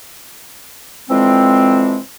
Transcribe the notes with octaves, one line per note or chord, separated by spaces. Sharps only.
D3 E3 F3 G#3 C4